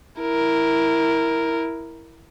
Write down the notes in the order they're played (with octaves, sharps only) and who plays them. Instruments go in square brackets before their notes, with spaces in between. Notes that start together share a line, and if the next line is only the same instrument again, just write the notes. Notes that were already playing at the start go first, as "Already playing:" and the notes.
[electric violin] E4 A#4